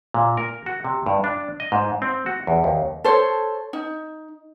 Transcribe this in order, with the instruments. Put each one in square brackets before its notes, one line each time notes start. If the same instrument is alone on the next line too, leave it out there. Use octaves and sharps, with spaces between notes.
[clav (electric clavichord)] A#2
A#4
F#4
C3
G2
D4
D#5
G#2
C4
F#4
E2
D#2
[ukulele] A4 C5 C#5
D#4